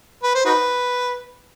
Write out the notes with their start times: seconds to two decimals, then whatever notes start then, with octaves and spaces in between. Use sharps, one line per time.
0.23 B4
0.35 C5
0.45 D#4 F#4 B4